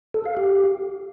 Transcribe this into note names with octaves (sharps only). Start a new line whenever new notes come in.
A4
F5
G4